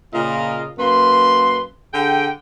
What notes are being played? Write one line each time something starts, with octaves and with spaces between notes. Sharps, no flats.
A#2 C#3 F4 A#4 D#5
F#2 A#3 B4 C6
D3 G#4 G5